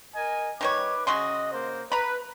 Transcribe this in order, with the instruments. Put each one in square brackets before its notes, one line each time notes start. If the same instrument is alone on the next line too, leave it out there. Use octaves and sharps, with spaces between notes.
[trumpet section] A#4 D#5 G#5
[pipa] D#3 G3 C#5 [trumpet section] B4 D6
[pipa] C#3 F#4 C6 [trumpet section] D#5
[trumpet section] A#3 C5
[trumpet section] B4 [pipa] A#5 B5